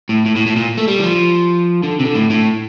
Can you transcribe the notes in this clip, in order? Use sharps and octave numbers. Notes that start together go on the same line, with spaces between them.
A2
A2
A2
A2
A#2
A3
G3
E3
F3
D3
C3
D3
A2
A2